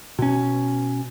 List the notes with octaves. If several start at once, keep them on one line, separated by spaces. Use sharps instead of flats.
B2 C#4